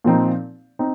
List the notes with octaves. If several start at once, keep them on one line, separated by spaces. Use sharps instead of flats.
A#2 F3 C4 D#4
C4 D#4